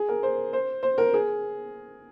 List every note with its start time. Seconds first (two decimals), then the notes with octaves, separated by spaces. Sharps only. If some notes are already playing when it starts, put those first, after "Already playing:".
Already playing: G#4
0.09 A#4
0.23 C5
0.53 C5
0.83 C5
0.98 A#4
1.14 G#4